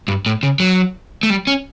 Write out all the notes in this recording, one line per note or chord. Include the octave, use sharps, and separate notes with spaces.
G2
A2
C#3
F#3
A3
G3
C#4